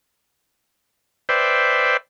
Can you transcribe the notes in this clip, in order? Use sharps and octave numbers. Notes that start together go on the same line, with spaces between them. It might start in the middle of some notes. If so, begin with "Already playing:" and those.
B4 C5 D5 E5 G5